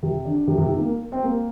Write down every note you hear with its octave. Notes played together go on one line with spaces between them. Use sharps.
C3
D3
C3
C3
D#3
A#3
C4
A#3